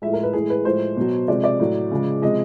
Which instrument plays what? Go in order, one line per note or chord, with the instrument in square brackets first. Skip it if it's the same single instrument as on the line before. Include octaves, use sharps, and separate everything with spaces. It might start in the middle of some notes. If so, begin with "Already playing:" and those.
[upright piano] A2 F3 G#3 E5
A#4
B4
A2 E3 G#3 G#4
B4
A2 F3 G#3 C5
B2 F#3
C3 F3 G#3 D5
D5
A2 F#3
C#3 F3 G#3
C3 F3 G#3 D#5